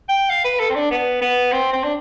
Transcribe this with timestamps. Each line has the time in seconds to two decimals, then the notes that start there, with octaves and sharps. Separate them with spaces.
0.09 G5
0.29 F5
0.44 B4
0.59 A4
0.69 C4
0.75 D4
0.91 B3
1.21 B3
1.52 C4
1.73 C4
1.84 D4